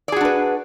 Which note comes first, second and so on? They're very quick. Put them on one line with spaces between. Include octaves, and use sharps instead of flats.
D5 G#4 F#4 D4 B4